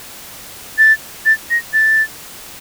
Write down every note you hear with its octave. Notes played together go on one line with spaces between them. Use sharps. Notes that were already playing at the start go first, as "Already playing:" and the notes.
A6
A6
A#6
A6